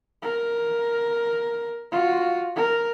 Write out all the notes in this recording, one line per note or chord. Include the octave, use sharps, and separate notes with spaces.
A#4
F4 F#4
A#4